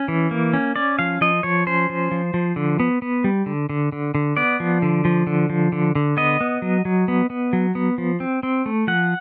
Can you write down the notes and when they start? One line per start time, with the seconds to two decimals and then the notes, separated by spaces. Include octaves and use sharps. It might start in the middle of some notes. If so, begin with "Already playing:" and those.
Already playing: C#4
0.08 E3
0.31 A#3
0.53 C#4
0.76 C#4 D5
0.99 F3 F5
1.21 F3 D#5
1.43 F3 C#5
1.67 C#4 C5
1.90 F3
2.11 F3
2.34 F3
2.56 D3
2.80 B3
3.02 B3
3.24 G3
3.46 D3
3.69 D3
3.92 D3
4.15 D3
4.37 B3 D5
4.60 F3
4.82 D3
5.05 F3
5.27 D3
5.50 F3
5.72 D3
5.95 D3
6.17 B3 D#5
6.41 B3
6.62 F#3
6.85 F#3
7.08 B3
7.30 B3
7.53 F#3
7.75 B3
7.98 F3
8.20 C4
8.43 C4
8.66 A3
8.87 F3 F#5